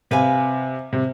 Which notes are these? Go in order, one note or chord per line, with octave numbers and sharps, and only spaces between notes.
C3 B4 F5 G#5
C3